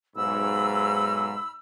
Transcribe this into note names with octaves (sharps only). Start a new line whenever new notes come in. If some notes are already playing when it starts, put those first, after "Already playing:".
B1 G#2 B5 E6